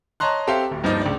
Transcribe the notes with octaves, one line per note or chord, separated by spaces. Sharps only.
C#5 D#5 A5 A#5 C6 F#6
C4 G4 A4 E5 F5 C6
D1
G2 F3 A#3 D#4
C#2 D4